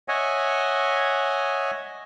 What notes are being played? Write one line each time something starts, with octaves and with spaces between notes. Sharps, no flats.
C#5 D#5 E5 F#5 G#5